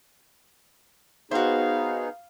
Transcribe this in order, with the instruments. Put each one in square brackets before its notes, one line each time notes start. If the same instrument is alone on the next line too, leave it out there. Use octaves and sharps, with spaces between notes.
[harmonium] B3 D#4 G#4 [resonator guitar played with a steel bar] F#4 C5 [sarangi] F5